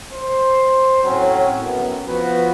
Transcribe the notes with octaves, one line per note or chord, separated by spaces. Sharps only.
C5
A2 F#3 C4 C#4
F#2 B3
F3 B3 F#4 B4